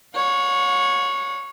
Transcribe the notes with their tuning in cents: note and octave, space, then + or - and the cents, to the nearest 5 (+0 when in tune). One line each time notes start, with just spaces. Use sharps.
C#5 +0 F#5 -40